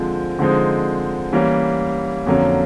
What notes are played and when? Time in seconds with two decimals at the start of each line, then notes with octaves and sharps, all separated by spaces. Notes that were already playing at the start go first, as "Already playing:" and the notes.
Already playing: D3 F3 G#3 C4
0.39 D3 F3 G#3 C4 D#4
1.33 E3 G3 A#3 C#4
2.26 F2 D3 F#3 A#3 C#4